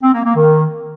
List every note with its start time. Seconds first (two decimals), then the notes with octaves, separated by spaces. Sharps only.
0.02 C4
0.13 A#3
0.24 A#3
0.35 D#3